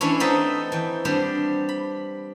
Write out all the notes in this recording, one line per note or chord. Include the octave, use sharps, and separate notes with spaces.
E3 A3 C#4 D4 E4 C#5
B3 C4 D#4 A4 D#5 E5
E3 G5
G3 B3 C4 D4 G4
B5